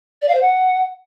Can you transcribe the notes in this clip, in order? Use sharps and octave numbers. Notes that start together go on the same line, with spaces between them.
D5
F5
C5
F#5